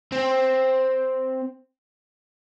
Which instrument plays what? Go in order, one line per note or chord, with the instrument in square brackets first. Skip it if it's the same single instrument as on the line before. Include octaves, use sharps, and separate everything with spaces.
[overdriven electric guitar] C4